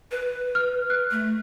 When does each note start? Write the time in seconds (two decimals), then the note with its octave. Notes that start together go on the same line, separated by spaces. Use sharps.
0.11 B4
0.55 F6
0.90 F#6
1.11 A3